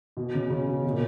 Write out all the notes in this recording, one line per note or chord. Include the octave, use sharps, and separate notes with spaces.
B2
C#3
C#3
B2
B2
A#2